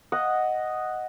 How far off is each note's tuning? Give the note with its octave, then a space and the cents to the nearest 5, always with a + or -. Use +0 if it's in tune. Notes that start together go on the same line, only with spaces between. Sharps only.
D#5 +0 F#5 +0